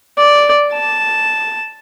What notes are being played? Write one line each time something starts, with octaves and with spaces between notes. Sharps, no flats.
D5
A5